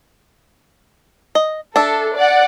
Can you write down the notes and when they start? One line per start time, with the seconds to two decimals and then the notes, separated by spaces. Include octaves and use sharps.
1.35 D#5
1.76 D4 A4 E5
2.16 D5 F#5